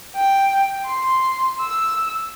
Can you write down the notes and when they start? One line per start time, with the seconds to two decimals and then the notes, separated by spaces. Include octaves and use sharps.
0.16 G5
0.86 C6
1.60 E6